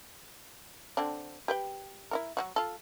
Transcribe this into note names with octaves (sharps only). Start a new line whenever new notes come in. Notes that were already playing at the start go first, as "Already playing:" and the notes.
D3 C4 D4
G4 B4 G5
E4 F#4 A#4
F#3 G3 F#4
F4 A4